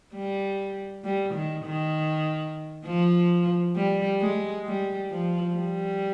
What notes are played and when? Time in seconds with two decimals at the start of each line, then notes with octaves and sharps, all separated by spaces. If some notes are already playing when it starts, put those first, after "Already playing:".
0.14 G3
1.04 G3
1.35 D#3
1.64 D#3
2.85 F3
3.75 G3
4.20 G#3
4.66 G3
5.10 F3
5.55 G3